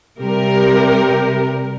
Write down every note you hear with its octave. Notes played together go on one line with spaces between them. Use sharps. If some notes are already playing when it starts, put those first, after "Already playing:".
C3 G3 G4 A#4